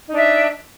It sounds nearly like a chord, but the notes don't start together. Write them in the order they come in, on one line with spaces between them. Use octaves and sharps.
D#4 D4 E5